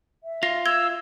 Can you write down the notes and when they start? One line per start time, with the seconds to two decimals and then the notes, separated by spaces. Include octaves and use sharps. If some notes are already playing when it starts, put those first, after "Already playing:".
0.24 E5
0.43 F4 F5 A#6
0.66 E6 G#6 G7